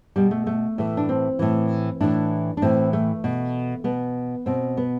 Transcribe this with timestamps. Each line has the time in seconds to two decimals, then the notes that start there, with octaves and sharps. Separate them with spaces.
0.16 B2 G3
0.31 A3
0.47 A3
0.78 A2 E3
0.97 D4
1.09 C4
1.39 A2 E3
2.00 A2 E3 D4
2.57 D4
2.62 A2 E3 C4
2.93 A3
3.24 B2
3.84 B2 B3
4.46 B2 C4
4.77 B3